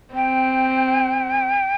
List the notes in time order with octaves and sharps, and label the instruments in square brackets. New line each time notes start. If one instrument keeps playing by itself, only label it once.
[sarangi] C4 [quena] G5